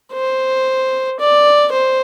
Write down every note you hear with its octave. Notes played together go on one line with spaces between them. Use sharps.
C5
D5
C5